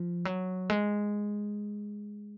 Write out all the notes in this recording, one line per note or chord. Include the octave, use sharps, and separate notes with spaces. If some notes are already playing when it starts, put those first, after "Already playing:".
Already playing: F3
F#3
G#3